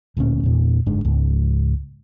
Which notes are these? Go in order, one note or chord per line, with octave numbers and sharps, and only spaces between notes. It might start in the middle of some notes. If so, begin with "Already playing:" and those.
D1 D2 A#2 C#4
E2 A#2
F#1 G#2 G#3 D4
C#2 G#2